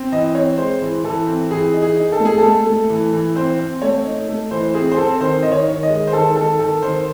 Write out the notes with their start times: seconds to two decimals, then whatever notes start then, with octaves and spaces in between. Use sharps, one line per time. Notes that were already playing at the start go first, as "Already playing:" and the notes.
Already playing: C4
0.12 E3 D#5
0.35 C4 C#5
0.58 G#3 C5
0.81 E3
1.04 E3 A4
1.27 C4
1.51 E3 G#4
1.74 D#4
1.82 G#4
1.97 D#4
2.12 A4
2.20 A3
2.25 G#4
2.38 A3 A4
2.66 A3
2.90 E3
3.13 E3
3.35 C4 C5
3.59 C4
3.82 A3 C#5
4.05 D#4
4.28 A3
4.51 E3 C5
4.74 C4 G#4
4.92 C5
4.97 C4 A4
5.20 D#3 C5
5.42 D#3 D#5
5.52 C#5
5.68 D#3
5.83 D#5
5.90 G#3
6.07 C5
6.13 D#3 A4
6.36 D#3 A4
6.59 D#3 A4
6.83 D#3 C5